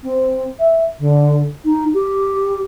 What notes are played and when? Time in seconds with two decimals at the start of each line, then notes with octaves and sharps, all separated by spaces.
0.03 C4
0.59 E5
0.99 D3
1.64 D#4
1.94 G4